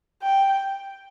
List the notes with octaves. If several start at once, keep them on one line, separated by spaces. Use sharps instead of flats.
G5